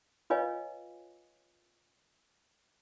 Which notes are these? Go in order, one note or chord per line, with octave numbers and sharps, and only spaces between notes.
F4 B4 C#5 D#5 F5 G#5